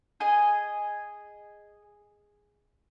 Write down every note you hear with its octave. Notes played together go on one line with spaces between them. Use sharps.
G#4 D#5 G#5